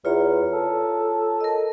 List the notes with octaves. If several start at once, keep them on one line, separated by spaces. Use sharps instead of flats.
E2 F4 C#5 A#5
A4
A#4 D#5